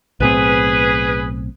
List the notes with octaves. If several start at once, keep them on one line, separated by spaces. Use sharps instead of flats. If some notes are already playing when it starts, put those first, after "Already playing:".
B1 A2 C4 G#4 B4